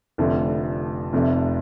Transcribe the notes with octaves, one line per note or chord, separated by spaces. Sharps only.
F1 F2 D3 F3 A3
F1 F2 C3 A3